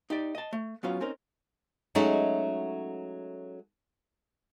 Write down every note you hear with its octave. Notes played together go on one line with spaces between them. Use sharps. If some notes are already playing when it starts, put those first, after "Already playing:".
D#4 G4 D5
D#5 A5
A3
F#3 B3 C#4 F4
C4 C#4 D#4 A#4
F#3 G#3 A3 C#4 D#4 F#4